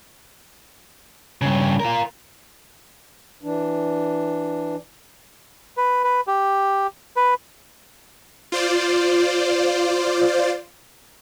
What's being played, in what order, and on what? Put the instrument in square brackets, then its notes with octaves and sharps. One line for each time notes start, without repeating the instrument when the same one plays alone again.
[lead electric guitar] G2 C#3
F4 A#4
[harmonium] E3 D4
[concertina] B4
B4
G4
B4
[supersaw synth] F4 C5 D5